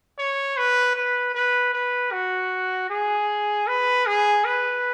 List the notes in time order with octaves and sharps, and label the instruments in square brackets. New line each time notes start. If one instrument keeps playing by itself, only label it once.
[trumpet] C#5
B4
B4
B4
B4
F#4
G#4
B4
G#4
B4